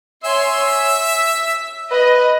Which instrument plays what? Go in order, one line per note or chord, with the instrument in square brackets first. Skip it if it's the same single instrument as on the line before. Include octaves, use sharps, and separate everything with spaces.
[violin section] C#5 G#5 C6 [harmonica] E5
[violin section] B6
[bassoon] B4 [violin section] D#5